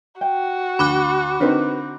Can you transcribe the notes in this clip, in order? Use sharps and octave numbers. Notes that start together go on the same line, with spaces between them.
F#4 G5
D2 B5 D6 F#6
D3 C4 D#4 A#4 B4